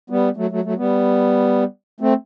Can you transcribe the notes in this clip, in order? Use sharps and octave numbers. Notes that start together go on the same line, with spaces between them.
G3 B3
F#3 A3
F#3 A3
F#3 A3
G3 B3
A3 C4